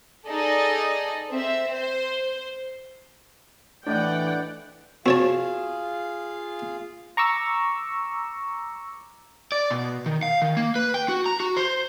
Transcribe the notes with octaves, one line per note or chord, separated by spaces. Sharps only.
D#4 G#4 A4 D5 D#5
C4 E5
C5
A2 E3 D4 D5 D#5 F#5 G5 G6
C4 F4 F#4 G#4 C#5 F5 A5
A#5 C#6 D6 E6
D5
B2
D#3
F5
D#3
A#3
B4
G5
F#4
A#5
F#4
C5